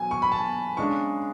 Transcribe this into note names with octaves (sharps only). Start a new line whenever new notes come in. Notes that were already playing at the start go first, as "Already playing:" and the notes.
Already playing: B2 F#3 G#5
C#6
B5
A5
C#3 G#3 D4 C#6